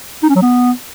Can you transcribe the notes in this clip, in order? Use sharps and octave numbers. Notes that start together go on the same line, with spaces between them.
D#4
C#4
F#3
B3